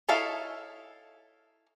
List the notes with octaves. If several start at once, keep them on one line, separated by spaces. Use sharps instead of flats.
D#4 E4 A4 C#5 F5